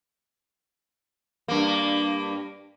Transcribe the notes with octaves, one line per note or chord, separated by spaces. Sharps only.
G2 A#3